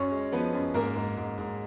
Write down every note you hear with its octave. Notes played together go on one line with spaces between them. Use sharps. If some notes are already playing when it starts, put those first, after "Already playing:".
Already playing: F#2 C#4 C#5
G#3
F3 B3 B4
F#2
G#2 A#3 A#4
G#2
G#2
G#2